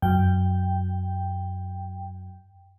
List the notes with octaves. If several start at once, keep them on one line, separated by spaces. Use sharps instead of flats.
F#2 G5